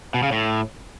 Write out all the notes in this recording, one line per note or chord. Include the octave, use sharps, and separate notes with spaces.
B2
C#3
A2